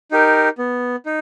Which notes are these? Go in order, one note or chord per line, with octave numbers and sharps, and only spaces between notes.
D#4 G4 A#4
B3
D#4